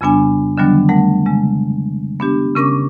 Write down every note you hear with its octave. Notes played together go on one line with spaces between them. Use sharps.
F2 C#3 G3 B3 D4 G#5
D3 D#3 F#3 G3 B3 D4
G3 A3 A#4 F#5
C#3 G#3
B3 D4 G4
C#3 C#4 A#4 C#6 D6